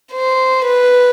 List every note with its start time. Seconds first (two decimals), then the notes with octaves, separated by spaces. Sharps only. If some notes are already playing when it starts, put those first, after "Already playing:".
0.13 C5
0.65 B4